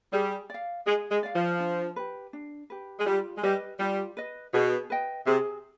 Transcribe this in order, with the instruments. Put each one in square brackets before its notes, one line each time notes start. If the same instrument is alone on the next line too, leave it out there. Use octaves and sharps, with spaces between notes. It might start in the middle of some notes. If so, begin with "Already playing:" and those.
[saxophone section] G3 [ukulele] G#4
[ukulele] D5 F5
[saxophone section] G#3 [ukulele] G#4
[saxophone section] G#3
[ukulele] D5 F5
[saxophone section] F3
[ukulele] D4
G4 B4
D4
G4 B4
[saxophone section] G#3
[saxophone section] G3 [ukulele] F4
[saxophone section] G#3
[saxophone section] G3 [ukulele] B4 D#5
[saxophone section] G3 [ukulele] F4
[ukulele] B4 D#5
[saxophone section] B2 [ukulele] G#4
[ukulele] B4 D#5 G5
[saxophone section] C3 [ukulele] G#4